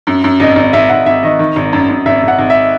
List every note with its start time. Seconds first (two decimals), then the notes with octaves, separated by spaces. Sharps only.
0.07 F#2
0.24 F#2
0.40 G#1 D#5
0.56 G#1
0.73 G#1 E5
0.89 G#1 F#5
1.06 G#1 E5
1.23 D#3 D#5
1.39 D#3
1.56 G#1
1.73 F#2
1.89 F#2
2.06 G#1 E5
2.23 G#1
2.28 F#5
2.38 G#1
2.50 E5